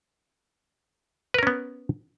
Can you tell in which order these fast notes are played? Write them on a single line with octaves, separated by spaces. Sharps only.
B4 A#4 C#4 B3